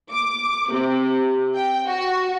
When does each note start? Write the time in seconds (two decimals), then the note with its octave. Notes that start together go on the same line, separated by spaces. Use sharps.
0.11 D6
0.71 C3
1.55 G5
1.87 F#4